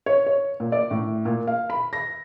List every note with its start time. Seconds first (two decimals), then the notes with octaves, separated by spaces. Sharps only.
0.06 C#5
0.27 C#5
0.60 A#2
0.72 D5
0.91 A2
1.25 A#2
1.47 F5
1.70 B5
1.93 A#6